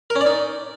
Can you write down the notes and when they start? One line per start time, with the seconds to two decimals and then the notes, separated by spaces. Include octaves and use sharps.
0.10 A#4
0.16 C#4
0.21 D5
0.26 D#4